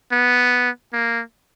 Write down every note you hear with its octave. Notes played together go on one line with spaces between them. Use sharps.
B3
A#3